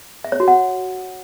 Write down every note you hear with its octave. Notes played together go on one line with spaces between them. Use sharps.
E5
C#5
F#4
F#5